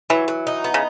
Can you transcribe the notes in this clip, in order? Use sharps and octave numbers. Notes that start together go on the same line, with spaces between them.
E3 F#3
F#3
D#4
B3
C#3